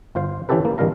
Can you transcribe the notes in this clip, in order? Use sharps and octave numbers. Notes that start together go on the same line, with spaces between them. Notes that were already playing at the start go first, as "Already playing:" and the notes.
G1 F4 C5 F5
E3 C#4 E4 G4 A4 B4
A#3
A1 D#3 G3 A#4 F5 A#5